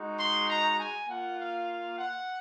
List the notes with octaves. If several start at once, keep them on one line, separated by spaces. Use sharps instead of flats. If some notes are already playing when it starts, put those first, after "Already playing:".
Already playing: G#3 D#4 F#4
C6
A#5
G#5
A#3 F4 F#5
F5
F#5